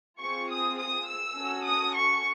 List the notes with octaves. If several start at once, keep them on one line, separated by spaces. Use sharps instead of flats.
C4 F4 G#4 C#6
D#6
D#6
E6
C#4 F#4 A4
D#6
C#6